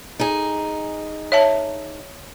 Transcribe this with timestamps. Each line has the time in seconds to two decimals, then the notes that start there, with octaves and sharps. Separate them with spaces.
0.20 D#4 G#4
1.32 C#5 E5 A5